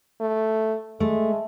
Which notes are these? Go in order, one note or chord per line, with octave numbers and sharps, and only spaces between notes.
A3
G#3 A3